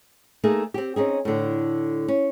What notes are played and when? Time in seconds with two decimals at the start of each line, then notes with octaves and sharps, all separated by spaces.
0.44 A3 A#3 D#4 G#4
0.74 C4 G4
0.96 C4 C#4 D#4 G#4
1.25 A2 D3
2.08 C#4